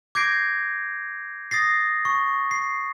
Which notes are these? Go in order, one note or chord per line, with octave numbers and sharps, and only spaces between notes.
D6 G6 G#6 A#6 C7 D7
D#6 A6 A#6 C7
C#6
C7